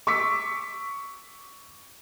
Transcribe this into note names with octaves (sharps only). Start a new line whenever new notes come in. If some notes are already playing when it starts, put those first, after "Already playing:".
C#6 D6 E6 B6